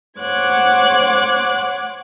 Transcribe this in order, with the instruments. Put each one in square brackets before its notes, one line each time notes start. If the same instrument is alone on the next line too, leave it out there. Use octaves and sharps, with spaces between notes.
[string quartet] C5 C#5 F#5 D6 F#6 G#6